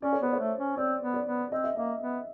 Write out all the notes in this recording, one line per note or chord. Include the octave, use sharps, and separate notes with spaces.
C#4 D5
C#5
B3 C5
C#5
A3
C#4
C4 D5
B3
D5
B3
C4 D#5
E5
A#3 D#5
B3